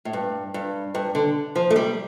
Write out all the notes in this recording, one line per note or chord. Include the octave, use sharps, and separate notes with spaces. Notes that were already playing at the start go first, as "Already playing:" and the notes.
A2
G2
G2
G2
D3
F3
A3
G3